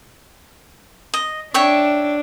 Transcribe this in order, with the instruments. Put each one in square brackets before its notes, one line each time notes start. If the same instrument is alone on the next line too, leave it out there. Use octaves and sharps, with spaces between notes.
[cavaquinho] D#5
[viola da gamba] D4 [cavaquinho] C#5 E5 G5